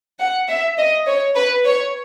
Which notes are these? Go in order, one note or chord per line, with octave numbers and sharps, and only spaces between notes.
F#5
E5
D#5
C#5
B4
C#5